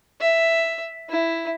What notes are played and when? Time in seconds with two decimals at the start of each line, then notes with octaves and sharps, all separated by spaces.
0.20 E5
1.09 E4